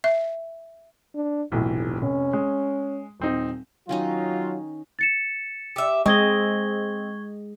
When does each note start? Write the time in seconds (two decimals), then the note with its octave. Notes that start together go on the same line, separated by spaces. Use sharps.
0.04 E5
1.15 D4
1.52 F1 B1 A2 E3
2.02 F1 C#4
2.33 G#3
3.20 D#1 C4 D#4
3.89 D#3 F#3 C#4 D#4 F4
4.99 A6 C#7 E7
5.76 G4 E5
6.06 G#3 C4 D#5 C#6 G#6 G7